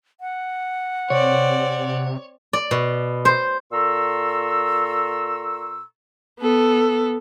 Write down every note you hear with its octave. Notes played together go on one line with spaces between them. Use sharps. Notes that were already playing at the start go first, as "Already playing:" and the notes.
F#5
C3 C4 C#5 D5
D5
B2
C5
A#2 A4 A#5 C6 C#6 E6
B3 A4